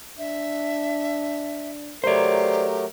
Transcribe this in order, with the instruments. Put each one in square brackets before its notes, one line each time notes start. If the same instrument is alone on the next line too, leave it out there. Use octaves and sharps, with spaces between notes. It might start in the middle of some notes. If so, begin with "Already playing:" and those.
[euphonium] D4 [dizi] E5
[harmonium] F#3 A3 A#4 [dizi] G4 [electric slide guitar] C5 D5